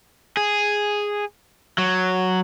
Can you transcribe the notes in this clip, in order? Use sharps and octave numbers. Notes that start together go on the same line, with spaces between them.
G#4
F#3